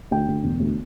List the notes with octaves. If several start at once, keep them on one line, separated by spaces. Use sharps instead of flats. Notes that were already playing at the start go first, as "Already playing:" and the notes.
D2 G5
D2
E1
D2